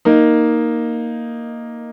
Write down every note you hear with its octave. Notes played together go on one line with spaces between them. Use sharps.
A#3 D#4